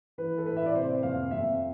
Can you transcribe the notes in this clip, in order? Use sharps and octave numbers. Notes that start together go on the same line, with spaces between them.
E3 B4
A4
A2 B4
E5
D5
C3 C5
F2 F5
F2 E5